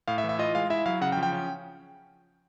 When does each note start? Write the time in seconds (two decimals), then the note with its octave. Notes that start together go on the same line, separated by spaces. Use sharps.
0.08 A2 F5
0.18 E5
0.24 E3
0.29 E5
0.39 F4 D#5
0.55 G#3 F5
0.70 E4 E5
0.86 F#3 F5
1.01 C#3 F#5
1.12 G5
1.17 F3
1.23 G5
1.32 C#4